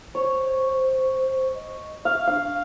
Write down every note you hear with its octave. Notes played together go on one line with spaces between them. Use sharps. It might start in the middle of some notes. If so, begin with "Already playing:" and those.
C5 C#5
D#5
E5 F5
D4 F5